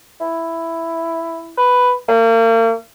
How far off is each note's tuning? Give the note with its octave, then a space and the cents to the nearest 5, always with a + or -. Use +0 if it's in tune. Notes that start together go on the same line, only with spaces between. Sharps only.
E4 +5
B4 +5
A#3 -40